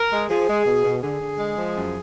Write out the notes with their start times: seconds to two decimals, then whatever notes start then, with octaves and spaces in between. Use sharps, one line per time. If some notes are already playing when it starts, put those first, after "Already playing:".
Already playing: A#4
0.12 G#3
0.30 F3 G#4
0.49 G#3
0.66 B2
0.84 B2
1.03 D3 G#4
1.21 D3
1.39 G#3
1.57 F3
1.75 F#2